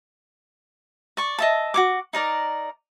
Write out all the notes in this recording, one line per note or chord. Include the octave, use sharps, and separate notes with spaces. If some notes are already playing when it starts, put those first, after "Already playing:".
D5 C#6
D#5 E5 A5
F#4 C#5 D6
D#4 A#4 D5